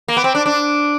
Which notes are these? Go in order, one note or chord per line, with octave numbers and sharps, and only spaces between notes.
A#3
B3
C4
D4
D4